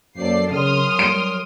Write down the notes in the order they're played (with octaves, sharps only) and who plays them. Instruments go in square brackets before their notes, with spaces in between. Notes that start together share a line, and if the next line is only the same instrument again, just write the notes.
[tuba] F#2 [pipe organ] F#3 A#3 C5 [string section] A4 D5 C7
[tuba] C#3 [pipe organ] F#3 A#4 [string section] C6 D#6 F6
[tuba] G3 [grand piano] D7